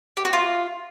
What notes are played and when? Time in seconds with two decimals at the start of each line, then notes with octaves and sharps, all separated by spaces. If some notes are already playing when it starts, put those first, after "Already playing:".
0.17 G4
0.25 F#4
0.33 F4